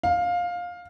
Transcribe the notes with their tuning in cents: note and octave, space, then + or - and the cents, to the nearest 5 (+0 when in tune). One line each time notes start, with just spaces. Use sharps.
F5 +15